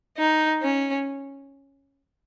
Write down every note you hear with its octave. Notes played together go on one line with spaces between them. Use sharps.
D#4
C#4